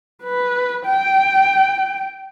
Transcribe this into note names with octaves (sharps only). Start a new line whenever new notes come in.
B4
G5